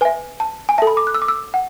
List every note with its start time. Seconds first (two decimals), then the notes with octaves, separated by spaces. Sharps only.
0.01 B4 E5 G#5
0.40 A5
0.69 G#5
0.78 A4 E5 A5
0.87 B5
0.97 D6
1.07 F#6
1.15 E6
1.22 D6
1.28 E6
1.54 F#5